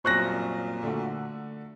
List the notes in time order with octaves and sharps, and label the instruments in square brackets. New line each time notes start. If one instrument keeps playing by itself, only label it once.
[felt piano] C2 F#2 C5 [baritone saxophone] A#2 [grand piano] C#6 F#6 A#6
[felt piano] D3 A3 F#4